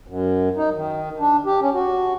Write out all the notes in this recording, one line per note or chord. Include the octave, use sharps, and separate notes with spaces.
F#2
D#4
D#3
D4
G4
C#4
F#4